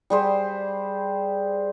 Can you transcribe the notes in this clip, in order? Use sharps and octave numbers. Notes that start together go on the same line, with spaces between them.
G3 G#4 C5